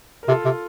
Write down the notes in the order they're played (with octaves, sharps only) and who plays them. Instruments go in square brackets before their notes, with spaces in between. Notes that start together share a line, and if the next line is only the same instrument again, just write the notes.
[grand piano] A#4
[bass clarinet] C3 [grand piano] F4 A4
[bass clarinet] C3